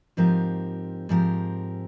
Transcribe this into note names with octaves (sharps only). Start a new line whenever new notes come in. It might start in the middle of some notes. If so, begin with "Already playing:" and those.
G#2 F3 C4 G4 A#4
G#2 F3 C4 G4 A#4